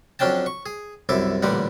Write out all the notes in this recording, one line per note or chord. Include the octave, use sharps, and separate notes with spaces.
F2 F#3 C#4 D4 G5 A5
C#6
G#4
C2 F#2 E4 A4 D6
A1 A#2 D3 G3 G4 F#5